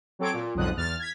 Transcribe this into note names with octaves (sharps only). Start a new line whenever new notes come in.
F#3 C4 A4 C#5 D6 D7
A#2
B1 F2 G#2 D3 D#6 F#6
E2 F6 A6
G#6 B6